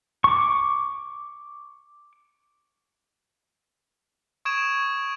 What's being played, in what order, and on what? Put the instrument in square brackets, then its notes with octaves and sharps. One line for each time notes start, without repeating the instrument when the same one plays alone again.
[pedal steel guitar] C#6 D6
[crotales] C#6 D#6 G#6 D7 E7